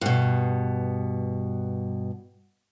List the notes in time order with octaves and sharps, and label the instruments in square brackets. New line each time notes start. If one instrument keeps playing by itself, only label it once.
[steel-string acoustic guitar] G2 B2